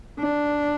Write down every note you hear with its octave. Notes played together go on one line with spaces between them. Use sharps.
D4